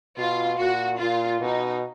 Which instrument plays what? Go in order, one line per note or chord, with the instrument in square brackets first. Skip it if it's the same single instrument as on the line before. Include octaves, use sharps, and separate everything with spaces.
[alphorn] B2 [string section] F4
[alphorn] A#2 [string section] F#4
[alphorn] A#2 [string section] F4
[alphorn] B2 [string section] D#4